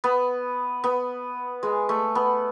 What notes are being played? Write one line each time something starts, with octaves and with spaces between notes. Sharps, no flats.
B3
B3
G#3
A3
B3